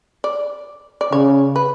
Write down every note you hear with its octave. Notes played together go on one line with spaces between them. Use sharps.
D5
D5
C#3 C#5
B4